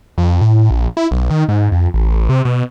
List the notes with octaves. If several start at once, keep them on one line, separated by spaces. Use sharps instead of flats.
F2
A2
A#1
E4
B1
D#3
G#2
F2
A1
A1
C3
B2